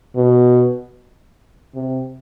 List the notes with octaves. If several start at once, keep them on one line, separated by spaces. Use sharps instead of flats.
B2
C3